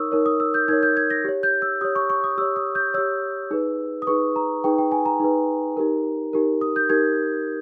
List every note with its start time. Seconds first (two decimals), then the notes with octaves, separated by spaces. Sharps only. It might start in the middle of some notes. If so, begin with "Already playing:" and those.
Already playing: D#4 A#4 C#5 C#6 D#6 E6
0.12 D#4 A#4 C#5
0.26 D#6
0.40 E6
0.54 G6
0.68 D#4 A#4 C#5 G#6
0.83 G6
0.97 G#6
1.10 A#6
1.24 G4 C#5
1.43 G6
1.62 E6
1.81 G4 C#5 D#6
1.95 C#6
2.10 C#6
2.24 D#6
2.38 G4 C#5 E6
2.56 D#6
2.75 G6
2.94 G4 C#5 E6
3.51 D#4 G#4 B4
4.02 D#6
4.07 D#4 G#4 B4 C#6
4.36 A#5
4.64 D#4 G#4 B4 G5
4.78 G5
4.92 G#5
5.06 A#5
5.20 D#4 G#4 B4
5.77 D#4 G4 A#4
6.33 D#4 G4 A#4
6.61 D#6
6.76 G6
6.89 D#4 G4 A#4 G#6